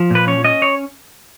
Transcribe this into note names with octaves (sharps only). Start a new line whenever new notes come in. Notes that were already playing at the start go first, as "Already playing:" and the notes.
Already playing: F3
A#2 B4
C#4 C#5
C#4 D#5
C#5